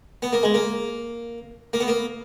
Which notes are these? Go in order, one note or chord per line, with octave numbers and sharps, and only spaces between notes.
B3
A#3
G#3
A#3
A#3
B3
A#3